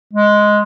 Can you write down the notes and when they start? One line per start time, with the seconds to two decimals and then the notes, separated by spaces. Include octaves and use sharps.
0.13 G#3